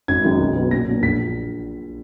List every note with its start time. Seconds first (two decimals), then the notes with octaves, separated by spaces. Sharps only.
0.08 G#1 G#6
0.24 F#2 D#3 G#3 D#4
0.40 B1
0.55 B2 F#3 B3
0.71 A#2 A#6
0.87 F#3 A#3 D4
1.03 A#1 B6